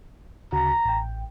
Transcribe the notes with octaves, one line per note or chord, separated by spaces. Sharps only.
D2 C#3 F#4 A#5
A1 G5